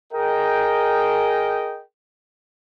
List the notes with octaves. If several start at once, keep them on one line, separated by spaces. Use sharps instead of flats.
G#4 A#4 D#5 G5